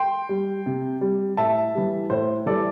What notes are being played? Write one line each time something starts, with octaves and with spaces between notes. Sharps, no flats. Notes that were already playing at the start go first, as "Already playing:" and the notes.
Already playing: G5 C6
G3
C3
G3
A2 E5 A5
E3 G3
A2 C5
E3 G3 A4 D5